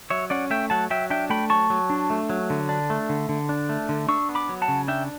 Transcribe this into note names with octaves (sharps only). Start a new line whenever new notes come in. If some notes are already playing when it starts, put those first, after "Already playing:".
F#3 C#5 E5
C#4 D5 F#5
A3 E5 G5
F#3 F#5 A5
F#3 E5 G5
D4 E5 G5
A3 G5 B5
F#3 A5 C#6
F#3
D4
A3
F#3
D3
D4
A3
D3
D3
D4
A3
D3
D4 C#6 E6
B3
B5 D6
F#3
F#5 A5
C#3
D4 E5 G5